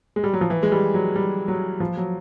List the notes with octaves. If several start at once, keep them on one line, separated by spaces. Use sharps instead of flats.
G#3
G3
F#3
F3
E3
G#3
G3
F#3
G3
F#3
F3
F#3